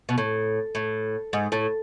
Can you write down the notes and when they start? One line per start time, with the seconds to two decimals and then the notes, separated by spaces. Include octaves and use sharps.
0.09 B2
0.18 A2
0.75 A2
1.33 G#2
1.52 A2